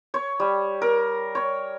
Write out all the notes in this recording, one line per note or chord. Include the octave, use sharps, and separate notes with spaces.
C#5
G3
A#4
C#5